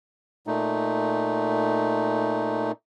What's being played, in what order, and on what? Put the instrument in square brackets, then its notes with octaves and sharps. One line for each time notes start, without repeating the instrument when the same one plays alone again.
[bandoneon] A#2 A3 D#4